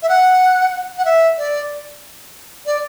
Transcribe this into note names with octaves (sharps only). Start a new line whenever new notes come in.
E5
F#5
F#5
E5
D5
D5